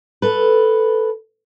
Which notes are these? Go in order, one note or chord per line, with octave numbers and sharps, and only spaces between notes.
A4 B4